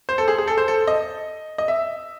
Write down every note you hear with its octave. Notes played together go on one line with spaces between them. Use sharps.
C5
A4
G#4
G#4
A4
C5
A4
D#5
D#5
E5